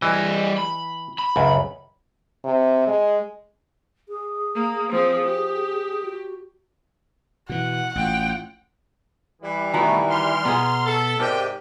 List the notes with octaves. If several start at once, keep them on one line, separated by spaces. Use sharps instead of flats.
E3 G3 D#5
B5
B5
C#2 F#2
C3
G#3
G#4
A#3
F3 C4
G4
F#4
B2 E3 F#5
A1 F4 G5
E3 G3
B2 D#3 A3 B3 E4 F#4 A#5 B5
C6 F6
B2 B3 G#4 A#5
A4
G#2 C3 G4 A#4 D5 G5